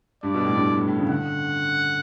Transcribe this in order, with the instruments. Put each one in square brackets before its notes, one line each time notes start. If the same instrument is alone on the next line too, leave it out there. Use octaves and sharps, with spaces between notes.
[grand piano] G2 [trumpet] D5
[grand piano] B2
A2
G2
A2
A2
A2
C#3
[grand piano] D3 [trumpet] F#5